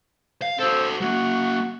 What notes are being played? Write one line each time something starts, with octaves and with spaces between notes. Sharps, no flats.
F5
C4 F#4 A4
F#3 A#3 F#4